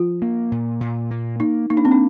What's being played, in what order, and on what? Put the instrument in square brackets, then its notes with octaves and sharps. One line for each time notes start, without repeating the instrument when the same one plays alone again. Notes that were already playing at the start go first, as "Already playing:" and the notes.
Already playing: [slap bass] F3 [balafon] F4
[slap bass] A#3
A#2
A#2
A#3
[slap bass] A#3 [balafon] D#4
[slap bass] A#3 [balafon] D#4
[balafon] D4
C4
D4